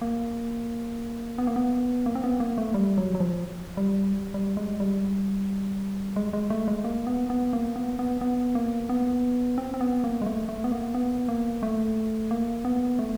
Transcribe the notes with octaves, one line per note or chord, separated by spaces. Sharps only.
A#3
B3
A#3
B3
A#3
C4
B3
A#3
A3
G3
F#3
F#3
F3
G3
G3
G#3
G3
G#3
G#3
A3
G#3
A#3
B3
B3
A#3
B3
B3
B3
A#3
B3
C4
C4
B3
A#3
G#3
A3
A3
B3
A#3
B3
A#3
A3
A#3
B3
A3